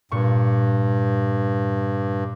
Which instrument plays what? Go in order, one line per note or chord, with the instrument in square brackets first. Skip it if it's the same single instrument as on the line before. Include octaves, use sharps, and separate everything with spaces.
[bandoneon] G2 [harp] A#2 C#6